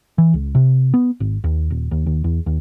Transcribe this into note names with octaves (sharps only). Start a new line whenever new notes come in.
E3
C#2
C3
B3
G#1
D#2
D#1
D#2
D#2
E2
D#2